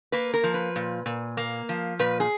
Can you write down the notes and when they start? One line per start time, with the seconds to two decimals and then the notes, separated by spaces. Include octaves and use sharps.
0.12 A#3 B4
0.34 A#4
0.44 F3
0.54 B4
0.76 A#2
1.06 A#2
1.37 A#3
1.69 F3
1.99 A#2 B4
2.20 G#4